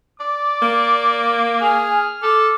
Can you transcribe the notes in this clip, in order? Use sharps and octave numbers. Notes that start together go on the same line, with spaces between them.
D5 D6
A#3
G#4 G#5 F6
A4 D6